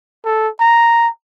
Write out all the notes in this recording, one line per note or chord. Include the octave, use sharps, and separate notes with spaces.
A4
A#5